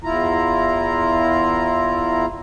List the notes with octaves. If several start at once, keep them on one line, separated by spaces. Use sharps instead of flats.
E2 E4 F4 A#5